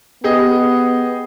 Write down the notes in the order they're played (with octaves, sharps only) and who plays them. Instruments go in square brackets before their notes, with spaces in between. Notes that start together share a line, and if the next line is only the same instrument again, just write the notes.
[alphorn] B3 [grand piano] G4 G#4 D#5